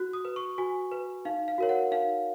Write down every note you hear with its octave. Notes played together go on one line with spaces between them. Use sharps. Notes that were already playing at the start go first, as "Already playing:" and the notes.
Already playing: F#4 F#6
D#6
B4
C#6
F#4 G#5
B4
D#4 F5
F5
F#4 A#4 C#5
F#5
D#4 F5